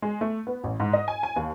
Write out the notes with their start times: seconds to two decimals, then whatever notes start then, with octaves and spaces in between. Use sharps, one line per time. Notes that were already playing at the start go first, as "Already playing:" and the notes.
0.02 G#3
0.21 A3
0.47 B3
0.64 A1
0.80 G#2
0.93 D#5
1.08 G#5
1.23 G#5
1.36 D#2